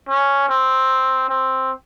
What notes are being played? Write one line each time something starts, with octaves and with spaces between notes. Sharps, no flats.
C#4
C4
C4